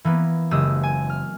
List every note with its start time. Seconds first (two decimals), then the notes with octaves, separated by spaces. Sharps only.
0.05 E3 A#3 B3
0.51 F#1 G#3 G4 D#6 E6
0.83 G#5
1.10 F6